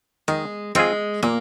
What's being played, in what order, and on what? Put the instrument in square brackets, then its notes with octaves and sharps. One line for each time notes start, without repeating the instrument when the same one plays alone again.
[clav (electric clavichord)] D#3 [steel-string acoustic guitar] G#3
[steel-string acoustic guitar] G#3 [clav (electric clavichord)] C4 F4 G#4
[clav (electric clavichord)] A#2 [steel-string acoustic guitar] A#3